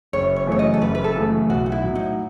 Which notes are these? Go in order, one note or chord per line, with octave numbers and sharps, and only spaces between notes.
F#1 C#5
C#5
F#2 C#3 E3 A3 C#5
D#5
A4
F#1 B4
B4
A4
F#2 C#3 E3 A3
B1 F#4
D#4
E4
A2 F#3
D#4